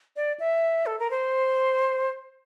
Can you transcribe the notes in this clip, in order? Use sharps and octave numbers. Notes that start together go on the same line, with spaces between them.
D5
E5
A4
A#4
C5